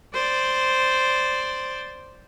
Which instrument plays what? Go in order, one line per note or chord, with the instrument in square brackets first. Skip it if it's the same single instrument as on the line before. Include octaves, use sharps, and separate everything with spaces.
[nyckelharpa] C5 D5